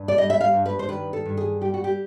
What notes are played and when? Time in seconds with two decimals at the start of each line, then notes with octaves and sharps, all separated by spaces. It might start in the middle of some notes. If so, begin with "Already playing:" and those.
Already playing: G2
0.08 D5
0.17 G3 D#5
0.30 E5
0.41 F5
0.53 G2
0.66 B4
0.79 C5
0.89 D#3 B4
1.13 A4
1.26 G2
1.37 G#4
1.61 G3 G4
1.74 F#4
1.84 G4